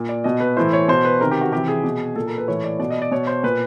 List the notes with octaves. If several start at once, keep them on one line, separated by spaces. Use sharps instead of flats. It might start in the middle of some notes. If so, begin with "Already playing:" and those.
Already playing: A#2
D5
B2 D#5
B4
A2 E3 C5
C#5
B2 C5
B4
C3 D#3 A#4
G4
F#4
C3 E3 G4
G#4
B2
A#2 A4
A#4
B4
A2 E3 C#5
D5
B2 D5
D#5
D5
B2 C#5
C5
A#2 B4